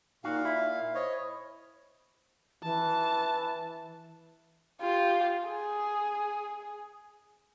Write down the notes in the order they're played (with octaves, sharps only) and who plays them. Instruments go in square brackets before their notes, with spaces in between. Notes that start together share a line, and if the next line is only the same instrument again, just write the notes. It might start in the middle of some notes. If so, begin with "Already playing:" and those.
[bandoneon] A#2 F5 [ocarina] D#4 [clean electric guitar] F#4
[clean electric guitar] E4 [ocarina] E5
[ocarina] C5 [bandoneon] C#5 D#5
[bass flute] E3 [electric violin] A5
[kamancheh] F4 G4
G#4